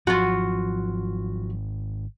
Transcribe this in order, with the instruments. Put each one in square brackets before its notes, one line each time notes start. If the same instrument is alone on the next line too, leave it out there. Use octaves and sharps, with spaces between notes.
[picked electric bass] G#1 [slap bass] F3 F#3 [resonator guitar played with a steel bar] F4 F#4